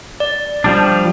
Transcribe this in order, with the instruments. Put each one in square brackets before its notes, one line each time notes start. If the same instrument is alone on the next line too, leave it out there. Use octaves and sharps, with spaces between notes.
[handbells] D5
[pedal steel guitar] F3 G3 D4